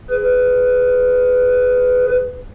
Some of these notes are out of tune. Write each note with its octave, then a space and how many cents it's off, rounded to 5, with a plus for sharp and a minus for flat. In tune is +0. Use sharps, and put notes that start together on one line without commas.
G#4 +0 B4 +20